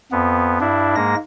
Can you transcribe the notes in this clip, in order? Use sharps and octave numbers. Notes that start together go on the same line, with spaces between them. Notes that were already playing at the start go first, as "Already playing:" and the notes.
F2 B3
G2 D4 E4
G#2 G#3 A#3 A#6